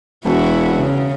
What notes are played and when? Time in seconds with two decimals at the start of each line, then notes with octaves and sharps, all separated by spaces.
0.25 E1 E4 F#4
0.76 C#3